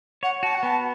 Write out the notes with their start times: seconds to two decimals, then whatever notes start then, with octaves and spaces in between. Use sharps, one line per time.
0.23 C#5 F#5
0.43 F#4 A5
0.55 F#5
0.63 B3 A5